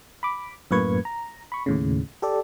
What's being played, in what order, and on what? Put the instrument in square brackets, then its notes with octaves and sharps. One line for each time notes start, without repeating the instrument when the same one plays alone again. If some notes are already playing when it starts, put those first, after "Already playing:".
[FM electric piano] B5 D6
F#2 A2 A#3 B4 C#6 G#6
A#5
B5 C#6
D#2 A2 C#3
G4 A4 D5